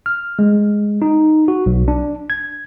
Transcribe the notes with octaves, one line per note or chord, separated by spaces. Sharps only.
F6
G#3
D#4
F#4
B1
D4
G#6